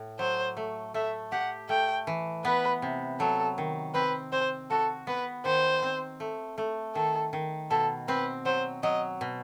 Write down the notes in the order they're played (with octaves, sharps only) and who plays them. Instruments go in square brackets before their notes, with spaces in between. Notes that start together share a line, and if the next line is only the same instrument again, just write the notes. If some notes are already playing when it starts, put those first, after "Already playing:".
Already playing: [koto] A2
[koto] F#3 [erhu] C5
[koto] A3
[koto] A3 [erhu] E5
[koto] G4 [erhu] F#5
[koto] A3 [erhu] G5
[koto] E3
[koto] B3 [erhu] B4
[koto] C3
[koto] F#3 [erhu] A4
[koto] D#3
[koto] C4 [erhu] B4
[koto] C4 [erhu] C5
[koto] F#4 [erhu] A4
[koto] B3 [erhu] B4
[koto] D#3 [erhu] C5
[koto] C4
A3
A3
[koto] D#3 [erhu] A4
[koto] D#3
[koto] B2 [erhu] A4
[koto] C4 [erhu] B4
[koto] F#3 [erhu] C5
[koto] F#3 [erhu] D#5
[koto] B2